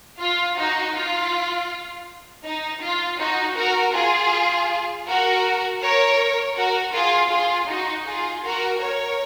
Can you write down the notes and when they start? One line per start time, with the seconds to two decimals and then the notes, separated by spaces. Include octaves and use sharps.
0.20 F4
0.58 D#4 F#4
0.95 F4
2.45 D#4
2.82 F4
3.19 D#4 F#4
3.57 F#4 A#4
3.94 F4 G#4
5.07 F#4 A#4
5.82 A#4 C#5
6.56 F#4 A#4
6.93 F4 G#4
7.31 F4 G#4
7.68 D#4 F#4
8.06 F4 G#4
8.43 F#4 A#4
8.81 A#4 C#5